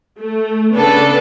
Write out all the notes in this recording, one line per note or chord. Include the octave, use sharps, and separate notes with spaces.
A3
C#3 B3 D4 A4 B4